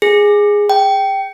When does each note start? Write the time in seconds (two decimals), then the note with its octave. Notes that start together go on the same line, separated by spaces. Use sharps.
0.02 G#4
0.69 G5